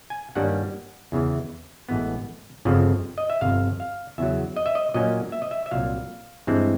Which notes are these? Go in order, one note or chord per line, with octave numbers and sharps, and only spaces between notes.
G#5
G2 D#3 G3 A#3 C#4 F#5
E2 C#3 E3
A1 A2 E3 G#3 B3
G1 F2 C#3 F3
D#5
E5
G1 F2 C3 F5
F5
E2 C#3 F#3 E5
D#5
E5
D#5
A#2 F#3 A#3 C#4 D#5
E5
D#5
E5
E5
C2 A#2 F#3 F5
G2 E3 G#3 C4